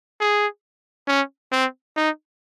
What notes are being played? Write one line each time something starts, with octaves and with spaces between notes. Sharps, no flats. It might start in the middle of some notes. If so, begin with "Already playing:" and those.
G#4
C#4
C4
D#4